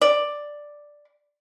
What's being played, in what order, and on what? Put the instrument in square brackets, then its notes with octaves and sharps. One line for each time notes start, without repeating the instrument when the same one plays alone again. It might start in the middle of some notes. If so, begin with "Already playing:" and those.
[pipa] D5